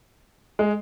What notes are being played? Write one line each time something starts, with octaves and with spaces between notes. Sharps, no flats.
G#3